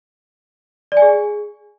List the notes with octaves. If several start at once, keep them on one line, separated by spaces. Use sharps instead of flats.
D5
G#5
G#4